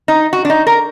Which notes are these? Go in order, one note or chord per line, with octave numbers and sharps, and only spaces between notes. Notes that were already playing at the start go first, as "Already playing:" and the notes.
D#4
F#4
D4
D#4
A#4